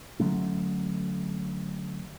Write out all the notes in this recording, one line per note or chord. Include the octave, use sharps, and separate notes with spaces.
D3 F#3 A3 C#4